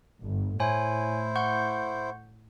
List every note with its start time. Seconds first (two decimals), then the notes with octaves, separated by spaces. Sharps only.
0.19 G1
0.60 A2 E4 C5 C#5 G#5
1.36 F#5 C#6 G6